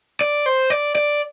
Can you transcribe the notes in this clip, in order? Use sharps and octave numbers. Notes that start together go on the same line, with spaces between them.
D5
C5
D5
D5